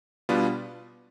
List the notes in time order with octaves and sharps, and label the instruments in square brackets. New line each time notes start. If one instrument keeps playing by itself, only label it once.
[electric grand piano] B2 G3 B3 D4 F4